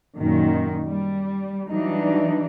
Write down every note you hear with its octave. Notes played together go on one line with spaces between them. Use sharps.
F#2 A#2 D#3
G3
E3 F#3 G3 D4 D#4